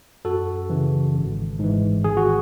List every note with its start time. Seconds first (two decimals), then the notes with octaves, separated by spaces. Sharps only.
0.25 F#2 F#4 A4
0.70 C#3 E3
1.16 G#1
1.59 G#2 E3
2.04 G#1 G#4
2.17 F#4